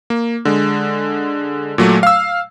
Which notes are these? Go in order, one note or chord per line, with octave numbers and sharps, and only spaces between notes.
A#3
D3 G#3
A#2 F#3 A3
F5 E6